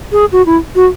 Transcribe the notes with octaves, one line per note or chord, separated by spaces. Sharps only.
G#4
F#4
E4
F#4